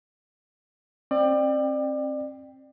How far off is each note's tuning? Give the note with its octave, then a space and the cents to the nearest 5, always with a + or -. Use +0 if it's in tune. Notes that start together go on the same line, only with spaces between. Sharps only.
C4 +35 D5 +30 G5 +10